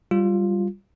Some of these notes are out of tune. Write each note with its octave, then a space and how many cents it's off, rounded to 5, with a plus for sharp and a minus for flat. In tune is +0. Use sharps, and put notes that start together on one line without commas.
G3 +0 F4 +0